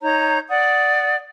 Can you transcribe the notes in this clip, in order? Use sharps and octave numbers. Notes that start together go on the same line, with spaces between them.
D#4 C#5 A#5 G6
D5 F#5 D#6